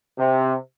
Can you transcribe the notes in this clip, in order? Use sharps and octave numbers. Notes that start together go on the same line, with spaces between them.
C3